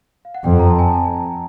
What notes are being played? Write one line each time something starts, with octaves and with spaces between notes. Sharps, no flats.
F5
F#5
F2 G5
A#5
A5
G#5
A5